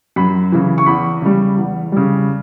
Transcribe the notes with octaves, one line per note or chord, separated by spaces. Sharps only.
F#2 B5
C#3 E3
C#6
E2 B5
C#3 G3
E2
C#3 G3